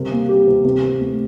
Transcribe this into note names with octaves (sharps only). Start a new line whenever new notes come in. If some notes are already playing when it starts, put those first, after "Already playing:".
Already playing: C3 G3 A#4
A#3
G3 G4
C3
C3
C3
A3